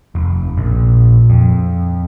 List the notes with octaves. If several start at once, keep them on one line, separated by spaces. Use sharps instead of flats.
F1
A#1
F2